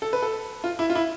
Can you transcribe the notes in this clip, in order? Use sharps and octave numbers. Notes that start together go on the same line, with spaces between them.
A4
B4
A4
F4
E4
F4
E4